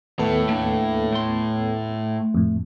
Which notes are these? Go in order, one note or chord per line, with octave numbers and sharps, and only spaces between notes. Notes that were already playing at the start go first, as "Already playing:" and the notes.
D#2 A2 B3 A4
A#3 D4
A3 C6
F2 A2